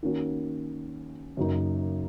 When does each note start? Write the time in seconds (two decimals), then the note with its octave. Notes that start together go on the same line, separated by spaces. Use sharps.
0.03 D#3 A#3 C#4 F#4
1.37 F#2 C#3 F#3 A#3 D#4